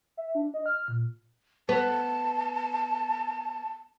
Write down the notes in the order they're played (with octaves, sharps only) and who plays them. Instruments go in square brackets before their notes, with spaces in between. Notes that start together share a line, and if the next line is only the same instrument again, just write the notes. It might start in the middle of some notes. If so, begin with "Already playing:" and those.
[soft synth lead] E5
D4
D#5
F6
A#2
[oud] B3 [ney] A5